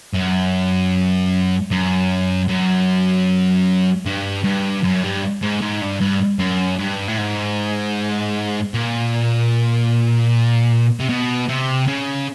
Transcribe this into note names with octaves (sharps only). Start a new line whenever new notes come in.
F#2
F#2
F#2
G2
G2
F#2
G2
G#2
G#2
G2
G2
F#2
G2
A2
G#2
A#2
C3
B2
C3
C#3